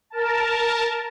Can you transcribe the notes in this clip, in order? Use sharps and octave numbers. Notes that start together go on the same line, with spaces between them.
A#4 A5